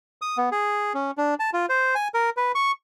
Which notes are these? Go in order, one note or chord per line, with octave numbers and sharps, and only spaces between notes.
D#6
B3
G#4
C#4
D4
A5
F4
C5
G#5
A#4
B4
C#6